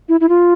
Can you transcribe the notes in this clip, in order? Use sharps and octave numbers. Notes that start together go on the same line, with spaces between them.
E4
E4
F4